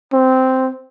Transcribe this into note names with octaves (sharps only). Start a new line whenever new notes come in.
C4